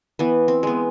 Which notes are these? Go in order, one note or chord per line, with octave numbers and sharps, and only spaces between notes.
E3 B3
C4
G#3 B3